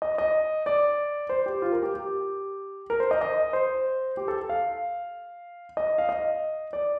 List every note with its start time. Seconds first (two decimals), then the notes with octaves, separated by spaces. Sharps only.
0.02 D#5
0.18 D#5
0.66 D5
1.29 C5
1.46 G4
1.62 F4
1.72 A#4
1.83 G4
1.94 G4
2.90 A#4
3.00 C5
3.11 D#5
3.21 D#5
3.53 C5
4.17 G4
4.28 A4
4.49 F5
5.77 D#5
5.98 F5
6.09 D#5
6.73 D5